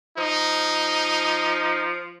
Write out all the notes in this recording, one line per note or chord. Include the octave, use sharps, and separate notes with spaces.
F3 D#4